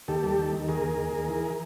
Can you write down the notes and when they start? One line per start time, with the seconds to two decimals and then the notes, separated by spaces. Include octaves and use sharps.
0.08 D#2 G4 A4
0.23 G3
0.38 D#2
0.53 D#3
0.68 D#2 G#4 A#4
0.83 D#2
0.98 D#2
1.13 D#2
1.28 E3